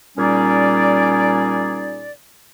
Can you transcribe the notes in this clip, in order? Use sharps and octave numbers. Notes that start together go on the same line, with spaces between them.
A#2 G3 C#4 D#4 G#4 D5